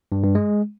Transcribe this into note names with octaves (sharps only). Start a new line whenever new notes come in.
G2
G2
G#3